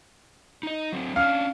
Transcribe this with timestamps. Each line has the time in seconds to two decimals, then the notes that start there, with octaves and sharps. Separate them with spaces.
0.63 D#4 D#5
0.93 F#3 C4
1.16 C#4 D4 F5 F6